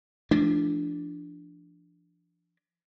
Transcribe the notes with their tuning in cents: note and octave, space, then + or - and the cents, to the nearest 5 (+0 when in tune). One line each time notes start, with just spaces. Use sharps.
F3 -40 A3 -20 D4 +0